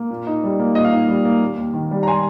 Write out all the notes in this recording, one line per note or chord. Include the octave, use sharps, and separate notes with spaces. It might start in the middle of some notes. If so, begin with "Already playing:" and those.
Already playing: A#3
A#2
D#4
G3
A#3
A#2 D#5
F5
D#4 D#5
G3
A#3
D#2
D#2
D#3
G3
A#5
G#5 C6